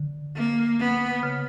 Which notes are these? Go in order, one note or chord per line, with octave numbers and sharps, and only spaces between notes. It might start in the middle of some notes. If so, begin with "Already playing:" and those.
Already playing: D3
A#3
B3
C#3